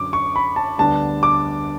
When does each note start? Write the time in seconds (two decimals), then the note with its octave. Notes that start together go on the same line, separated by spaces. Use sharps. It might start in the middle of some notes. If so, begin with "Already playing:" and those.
Already playing: F#2 D3 F#3 D6
0.13 C#6
0.36 B5
0.56 A5
0.78 D2 D3 G3 B3 D4 A5
1.23 D6